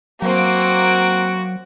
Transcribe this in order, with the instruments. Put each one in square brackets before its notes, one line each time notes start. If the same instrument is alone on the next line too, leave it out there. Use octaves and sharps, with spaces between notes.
[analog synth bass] F#3 [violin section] A#3 C4 D7 [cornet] F#4